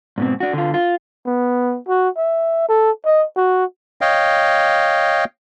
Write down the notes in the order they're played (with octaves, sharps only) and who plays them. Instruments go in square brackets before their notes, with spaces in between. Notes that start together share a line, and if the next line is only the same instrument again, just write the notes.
[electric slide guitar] G#2 B2 C4
D4 F#4
D3 F4
F4
[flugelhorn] B3
F#4
E5
A4
D#5
F#4
[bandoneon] C#5 D#5 F5 G5